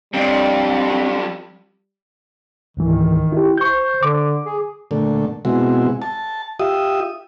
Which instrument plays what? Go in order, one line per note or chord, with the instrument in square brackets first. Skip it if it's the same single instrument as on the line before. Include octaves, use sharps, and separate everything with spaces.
[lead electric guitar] F2 [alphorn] G3 [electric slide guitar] C4 D4
[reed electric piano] C#2 G#2 E3 [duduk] D#3
[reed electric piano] E4 G4
[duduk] C5 [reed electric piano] C#6 G6
[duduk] D3 [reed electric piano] D6
[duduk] G#4
[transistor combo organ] A#2 D3 A3
B2 G#3 C4 E4 F#4
A5
F4 G4 E5 D#6